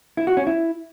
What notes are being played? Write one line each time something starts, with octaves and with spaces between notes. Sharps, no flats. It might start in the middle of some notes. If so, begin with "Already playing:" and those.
E4
F#4
C#4
E4